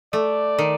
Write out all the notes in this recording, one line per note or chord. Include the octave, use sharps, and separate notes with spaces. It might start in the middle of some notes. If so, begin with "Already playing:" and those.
A3 D5
D#3